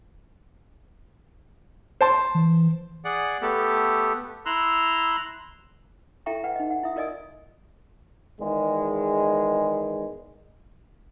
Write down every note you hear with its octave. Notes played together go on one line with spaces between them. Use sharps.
C5 A5 C6
E3
G#4 D5 F#5
A3 B3 G4 A4
E4 A#5 C6 E6 F#6
E4 A4 E5 G5 A#5 C#6
B4 F#5 G5
D#4 D#5
F#5
E4 E5 D#6
F4 A#4 D5 D#5 G#5 D#6
E2 D#3 G#3